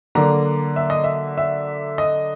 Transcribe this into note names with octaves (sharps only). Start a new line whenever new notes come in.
D3 F#3 A#3 D4 A#5
E5
D#5
E5
E5
D#5